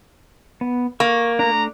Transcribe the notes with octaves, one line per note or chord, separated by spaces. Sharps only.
B3
A#3 C#6
A3 D4 A#5